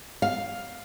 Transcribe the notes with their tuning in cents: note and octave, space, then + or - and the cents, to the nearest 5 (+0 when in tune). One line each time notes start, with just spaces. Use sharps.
F5 +5